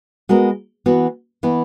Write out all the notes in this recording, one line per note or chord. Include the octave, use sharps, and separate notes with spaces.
G#3 B3 F#4 A#4
E3 B3 F#4
E3 B3 E4